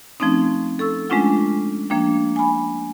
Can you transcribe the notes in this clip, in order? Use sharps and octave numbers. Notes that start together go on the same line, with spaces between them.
F3 A3 C4 C#4 D#4
A4 C#6 E6
G#3 A3 C#4 D4 F4 F#5
F3 A#3 D4 G5
G#5 B5